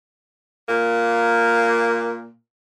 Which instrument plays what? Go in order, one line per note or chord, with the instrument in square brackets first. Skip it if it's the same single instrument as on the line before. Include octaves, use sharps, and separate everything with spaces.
[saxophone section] A#2 A#3